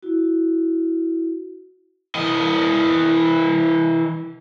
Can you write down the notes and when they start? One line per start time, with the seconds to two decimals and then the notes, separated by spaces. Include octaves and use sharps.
0.03 E4 F#4
2.15 E3 D#5